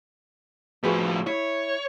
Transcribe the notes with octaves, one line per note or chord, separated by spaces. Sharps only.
A2 F3 F#4 G#4 B4
E4 C#5